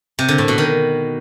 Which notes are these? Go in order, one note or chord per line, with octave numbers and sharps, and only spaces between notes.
C3
D3
A2
B2
D#3